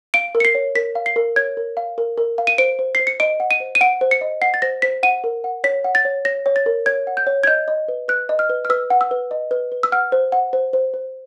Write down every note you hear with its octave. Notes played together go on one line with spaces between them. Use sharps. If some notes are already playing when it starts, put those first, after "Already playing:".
F5 D7
A#4
C#7
C7
C#5
A#4 B6
F5
C7
A#4
C#5 G#6
A#4
F5
A#4
A#4
F5
D#7
C5 D7
C5
C5 C7
C#7
D#5 D7
F#5
D#7
C5
D#7
F#5 D7
C5
C#7
D#5
F#5 C7
A6
C5 A#6
C5 B6
F#5 D#7
A#4
F#5
C#5 B6
F#5
A6
C#5
C#5 A#6
C#5
A6
A#4
C#5 G#6
F#5
G6
C#5
G#6
D#5 G6
D#5
B4
B4 F#6
D#5
F6
B4
F6
B4 E6
F#5
E6
B4
D#5
B4
B4
E6
F#5 F6
C5
F#5
C5
C5
C5